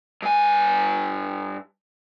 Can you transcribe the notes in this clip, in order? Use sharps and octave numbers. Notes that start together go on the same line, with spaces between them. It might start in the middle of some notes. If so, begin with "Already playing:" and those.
G2 G#5